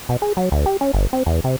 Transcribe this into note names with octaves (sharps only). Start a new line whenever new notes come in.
B2
G#4
F#3
D2
G4
C#4
G1
C4
E2
C3